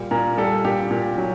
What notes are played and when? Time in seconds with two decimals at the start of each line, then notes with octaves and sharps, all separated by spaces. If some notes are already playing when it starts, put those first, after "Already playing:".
Already playing: A#2 G3
0.11 A#2 A#4
0.38 G3 A4
0.65 A#2 G4
0.91 A#2
1.18 F#3